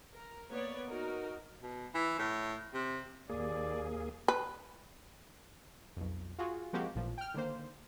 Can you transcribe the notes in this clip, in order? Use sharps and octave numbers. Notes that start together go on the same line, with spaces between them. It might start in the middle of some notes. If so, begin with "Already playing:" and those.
A#4
A#3 B3 C#5 D5
D#4 F#4 A#4
B2
E3
A2
C3
D#2 A#3 G#4 D5
B4
B1 F2
F4 F#4 G#4
F3 G#3 A#3 C4 F#4 G4
A1 A#2 F3
G5 F6
D3 D#3 A#3 C5